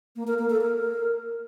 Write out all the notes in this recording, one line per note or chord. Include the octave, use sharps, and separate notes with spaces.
A#3
A#4
A#3
A4
A#4